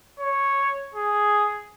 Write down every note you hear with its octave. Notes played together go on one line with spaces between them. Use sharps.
C#5
G#4